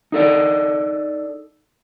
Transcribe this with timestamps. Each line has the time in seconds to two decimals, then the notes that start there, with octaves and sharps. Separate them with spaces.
0.12 D#4 A4 D5